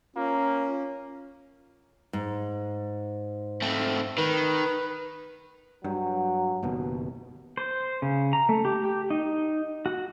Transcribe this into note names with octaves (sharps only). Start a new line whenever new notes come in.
A#3 C#4 F4
G#2
A3 C4
D#3 B4
G2 F#3
F#1 D#2 B2
C5
C#3
A#5
A3
G4
G4
D#4
F#4